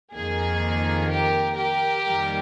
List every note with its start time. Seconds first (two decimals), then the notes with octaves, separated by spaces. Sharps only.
0.13 F2 D#3 A#3 G#4
1.09 G4 A#4
1.57 G4 A#4
2.04 F2 D#3 G3 A#3